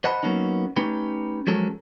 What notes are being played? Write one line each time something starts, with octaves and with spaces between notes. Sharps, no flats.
C5 D#5 F#5 A5 B5
F#3 A#3 B3 C#4 D#4
A3 C#4 D#4 G4 B4
F3 F#3 G#3 C#4 A4 A#4